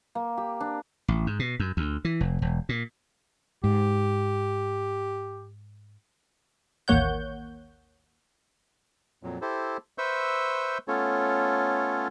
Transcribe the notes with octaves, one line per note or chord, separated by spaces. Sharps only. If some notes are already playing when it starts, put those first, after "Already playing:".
A#3
G4
D4
A1
G#2
B2
F#2
D2
E3
F1
E1
A#2
G#2 G4
A1 D#2 A#3 C#5 F#5 G6
F2 A#2 F#3
E4 G4 A4 C5
B4 C5 E5 C#6 E6 G6
A3 B3 C#4 F4 A4 C#5